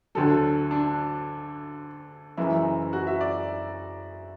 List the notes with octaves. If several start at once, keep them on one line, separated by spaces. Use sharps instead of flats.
D2 D3 F#3 A4
D4
F#1 F#2 E3 E4
F#4
E5
D5